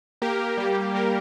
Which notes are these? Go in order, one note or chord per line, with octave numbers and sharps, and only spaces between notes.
A#3 G4 A#4
G3 A#3 G4
G3 A#3 G4 A#4